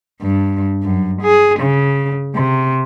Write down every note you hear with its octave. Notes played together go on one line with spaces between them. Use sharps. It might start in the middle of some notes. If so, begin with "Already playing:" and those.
G2
F#2
G#4
C#3
C3